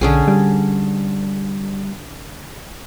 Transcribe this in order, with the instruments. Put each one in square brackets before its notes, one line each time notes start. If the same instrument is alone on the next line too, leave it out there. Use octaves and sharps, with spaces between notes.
[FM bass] B1 [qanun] D3 C#4 G#4
[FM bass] G3